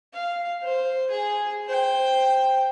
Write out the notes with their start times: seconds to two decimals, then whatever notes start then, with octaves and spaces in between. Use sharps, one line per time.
0.13 F5
0.63 C5
1.10 G#4
1.66 C5 G5